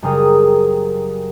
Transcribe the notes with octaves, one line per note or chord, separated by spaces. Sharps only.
F#1 G3 G#4 A#4 D#6